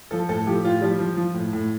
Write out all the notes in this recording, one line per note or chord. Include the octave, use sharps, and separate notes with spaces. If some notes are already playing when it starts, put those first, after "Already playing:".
F3 A4
A2 A4
F3 G4
A2 F4
F3 G3
F3
F3
A2
A2